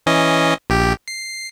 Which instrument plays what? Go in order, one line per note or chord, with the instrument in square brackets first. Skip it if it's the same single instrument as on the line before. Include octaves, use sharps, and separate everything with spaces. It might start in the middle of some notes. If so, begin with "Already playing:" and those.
[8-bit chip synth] E3 C#4 D#5
A#1 G4
C7